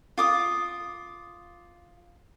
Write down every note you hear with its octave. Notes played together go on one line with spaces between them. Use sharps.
F4 D6 D#6